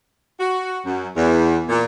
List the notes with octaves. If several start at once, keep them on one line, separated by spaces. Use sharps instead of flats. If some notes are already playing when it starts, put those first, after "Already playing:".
F#4
F#2
E2
A#2